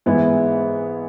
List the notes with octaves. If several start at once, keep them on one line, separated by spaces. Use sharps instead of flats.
G#2 E3 G#3 B3 E4